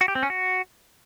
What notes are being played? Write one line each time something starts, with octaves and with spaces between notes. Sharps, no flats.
F#4
G4
C4
C#4
F#4